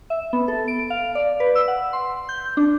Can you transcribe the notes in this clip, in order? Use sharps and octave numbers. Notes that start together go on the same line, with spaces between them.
E5
B3
A4
D7
F5
D5
B4
E6
F#5
C6
G6
D4